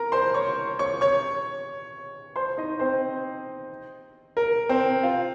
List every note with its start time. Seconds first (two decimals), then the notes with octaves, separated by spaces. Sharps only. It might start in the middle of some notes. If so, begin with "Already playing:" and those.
Already playing: A#4 A#5
0.12 C5 C6
0.34 C#5 C#6
0.79 C#5 C#6
1.01 C#5 C#6
2.36 C5 C6
2.58 D#4 D#5
2.80 C4 C5
4.37 A#4
4.69 C4 C5
5.03 F4 F5